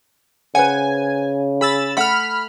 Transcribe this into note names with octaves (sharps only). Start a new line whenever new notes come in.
C#3 B4 C5 F#5 G#5
G#4 B5 E6 A6
A3 A4 F#5 B5 F6